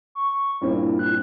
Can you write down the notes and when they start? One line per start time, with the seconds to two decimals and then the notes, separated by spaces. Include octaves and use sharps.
0.15 C#6
0.61 G2 A#2 C4 E4
0.99 F#6